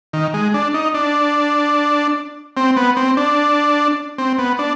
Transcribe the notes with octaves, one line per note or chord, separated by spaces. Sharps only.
D#3
G#3
D4
D#4
D4
C4
B3
C4
D4
C4
B3
D4